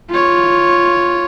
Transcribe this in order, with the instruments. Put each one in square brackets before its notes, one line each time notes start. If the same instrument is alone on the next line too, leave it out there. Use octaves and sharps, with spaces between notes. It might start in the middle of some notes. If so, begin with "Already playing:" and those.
[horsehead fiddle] F4 C#5